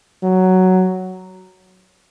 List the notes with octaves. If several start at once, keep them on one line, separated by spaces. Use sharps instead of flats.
F#3